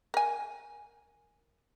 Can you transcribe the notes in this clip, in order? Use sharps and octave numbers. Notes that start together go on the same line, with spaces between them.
A#4 G#5